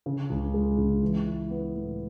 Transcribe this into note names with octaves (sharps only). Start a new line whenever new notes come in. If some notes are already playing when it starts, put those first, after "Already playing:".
C#3
C#2
G#3
C#2
E3
E4
B3
A2